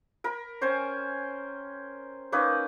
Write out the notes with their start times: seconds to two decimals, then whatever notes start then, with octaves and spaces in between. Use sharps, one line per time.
0.24 A#4 B5
0.61 C#4 C5 G5 G#5
2.32 A#3 C#4 D#4 B4